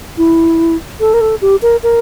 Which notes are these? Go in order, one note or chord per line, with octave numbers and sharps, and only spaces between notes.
E4
A4
A#4
A4
G4
A#4
A#4